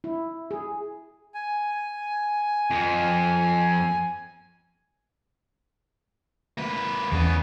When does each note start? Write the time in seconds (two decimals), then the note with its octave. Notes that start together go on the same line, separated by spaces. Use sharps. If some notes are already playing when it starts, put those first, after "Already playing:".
0.04 E4
0.51 G#4
1.34 G#5
2.70 F2
6.58 A#3 B4
7.12 E2 C#3 B3